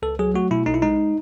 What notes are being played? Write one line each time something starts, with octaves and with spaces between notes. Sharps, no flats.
C#2 A4
F#3 G#4
A3 F#4
B2 E4
B1 D#4
E4
G#3 D#4